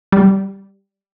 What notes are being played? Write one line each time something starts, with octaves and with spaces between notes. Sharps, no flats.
G3